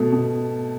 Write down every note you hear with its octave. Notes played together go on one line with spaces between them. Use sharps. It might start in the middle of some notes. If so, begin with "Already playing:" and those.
Already playing: B2 A3
B2